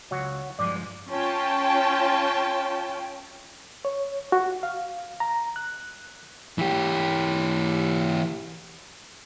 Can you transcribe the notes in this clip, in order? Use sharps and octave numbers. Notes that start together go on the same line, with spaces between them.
C#2 F#3 F#4
G2 F3 G#3 D5
C#4 F4 G5 A5
C#5
F#4
F5
A#5
F#6
E3 G4